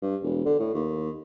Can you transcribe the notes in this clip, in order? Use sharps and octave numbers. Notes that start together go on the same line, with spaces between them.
G2
E1
D3
A2
D#2